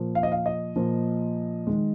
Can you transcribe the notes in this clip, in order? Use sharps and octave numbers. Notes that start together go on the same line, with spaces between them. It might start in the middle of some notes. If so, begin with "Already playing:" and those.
Already playing: A#2 F3 A#3
F5
D#5
F5
D#5
A#2 F3 A#3
D#3 G#3